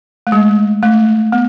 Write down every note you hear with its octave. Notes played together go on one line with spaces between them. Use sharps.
A3
G#3
A3
B3